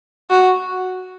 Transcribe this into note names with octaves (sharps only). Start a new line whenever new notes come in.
F#4